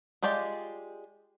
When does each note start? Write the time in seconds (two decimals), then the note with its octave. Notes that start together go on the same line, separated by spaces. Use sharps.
0.23 G#3 F4 G4 D5 G5